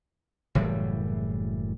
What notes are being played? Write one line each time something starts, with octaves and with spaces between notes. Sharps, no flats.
F#1 A2 E3 G3